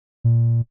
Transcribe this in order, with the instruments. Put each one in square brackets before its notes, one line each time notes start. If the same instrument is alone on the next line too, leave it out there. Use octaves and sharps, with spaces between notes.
[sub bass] A#2